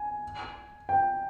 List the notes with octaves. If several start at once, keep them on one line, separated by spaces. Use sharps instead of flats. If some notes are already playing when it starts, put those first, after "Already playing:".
Already playing: G#5
G5